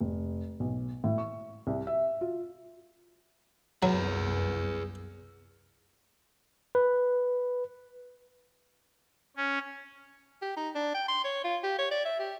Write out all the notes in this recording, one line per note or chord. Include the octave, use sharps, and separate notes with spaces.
F1
B1
A2
C#6
C2
E5
F4
C2 F#2 F#3 B3 G#4 B4
B4
C#4
G4
D#4
D4
G5
C6
C#5
F4
G4
C#5
D5
E5
G4